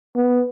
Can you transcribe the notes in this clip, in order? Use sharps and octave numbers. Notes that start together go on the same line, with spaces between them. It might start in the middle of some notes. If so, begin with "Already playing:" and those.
B3